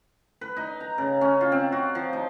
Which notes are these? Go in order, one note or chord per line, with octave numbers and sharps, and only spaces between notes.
B4
D#4
A#5
C#3
C#4
F4
C4
F#4
F3
D#4